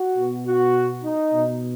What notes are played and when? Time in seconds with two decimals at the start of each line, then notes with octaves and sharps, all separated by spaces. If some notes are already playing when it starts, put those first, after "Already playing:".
Already playing: F#4
0.18 B2
0.46 F#4
1.04 D#4
1.33 B2